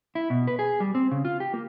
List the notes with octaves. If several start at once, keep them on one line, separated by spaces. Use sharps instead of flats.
E4
B2
B4
G#4
G3
C4
C#3
F4
G4
A#3